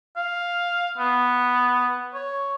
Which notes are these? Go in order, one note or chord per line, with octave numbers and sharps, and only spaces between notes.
F5
B3
C#5